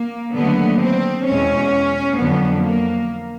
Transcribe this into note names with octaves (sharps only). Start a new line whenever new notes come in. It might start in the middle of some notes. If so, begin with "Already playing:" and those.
Already playing: A#3
D#2 D3 F#3 A3 B3
C4
E2 B2 G#3 C#4
F2 D3 F#3 B3
A#3